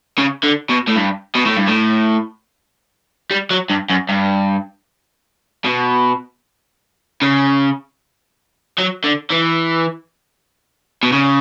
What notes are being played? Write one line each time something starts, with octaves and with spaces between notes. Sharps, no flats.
C#3
D3
B2
A2
G2
B2
A2
G2
A2
G3
F#3
G2
F#2
G2
B2
C#3
F#3
D3
E3
B2
C#3